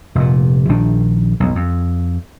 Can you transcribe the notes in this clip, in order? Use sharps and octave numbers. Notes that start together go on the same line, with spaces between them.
F1 A#2
A#1 D#3 D4
B1 F2
F2